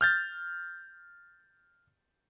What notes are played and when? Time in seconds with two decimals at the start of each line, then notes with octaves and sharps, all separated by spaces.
0.01 F6 G6 A6